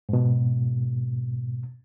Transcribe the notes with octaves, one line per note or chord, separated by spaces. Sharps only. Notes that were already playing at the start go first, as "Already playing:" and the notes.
G#2 B2